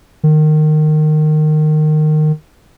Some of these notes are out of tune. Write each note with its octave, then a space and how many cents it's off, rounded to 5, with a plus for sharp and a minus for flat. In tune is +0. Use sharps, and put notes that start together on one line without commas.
D#3 -20